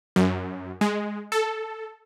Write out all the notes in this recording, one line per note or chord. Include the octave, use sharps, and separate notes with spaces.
F#2
G#3
A4